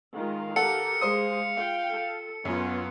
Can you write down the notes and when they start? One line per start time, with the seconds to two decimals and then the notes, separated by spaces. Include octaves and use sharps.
0.15 D#3 G#3 F4 F5
0.56 G4 A4 A#4 F#5 C#7
1.01 G#3 C5 F5 D#6
1.57 F4 G5
1.90 A4
2.45 F#2 B3 C#4 F4